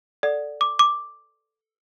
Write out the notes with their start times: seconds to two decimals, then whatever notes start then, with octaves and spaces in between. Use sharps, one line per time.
0.23 A4 D5 F#5
0.61 D6
0.79 D6